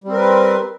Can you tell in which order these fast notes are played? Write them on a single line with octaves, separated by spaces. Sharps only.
G3 C4 A#4 B4